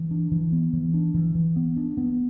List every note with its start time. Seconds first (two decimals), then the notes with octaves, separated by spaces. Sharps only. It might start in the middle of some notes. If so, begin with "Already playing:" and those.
Already playing: E3
0.11 D4
0.32 E3
0.52 B3
0.73 E3
0.94 D4
1.14 E3
1.35 E3
1.56 B3
1.76 D4
1.97 B3